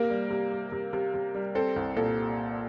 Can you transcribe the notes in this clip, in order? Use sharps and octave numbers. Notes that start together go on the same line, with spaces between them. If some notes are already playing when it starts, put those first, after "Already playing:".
Already playing: C3 A#3 A#4
G3
C3
G3
C3
C3
C3
G3
C4 A4
C2
A#2 A4